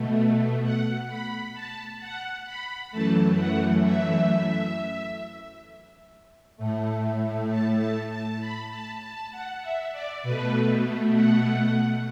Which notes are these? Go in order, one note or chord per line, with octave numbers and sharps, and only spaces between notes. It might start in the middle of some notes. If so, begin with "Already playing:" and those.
Already playing: B2 A3
F#5
B5
A5
F#5
B5
F#2 E3 A3 A5
F#5
E5
A2 A3
A5
A5
A5
B5
A5
A5
F#5
E5
D5
B2 A3 B4
F#5